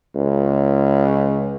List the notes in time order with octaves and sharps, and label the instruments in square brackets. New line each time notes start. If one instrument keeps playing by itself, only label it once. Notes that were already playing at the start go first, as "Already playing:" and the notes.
[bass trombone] C#2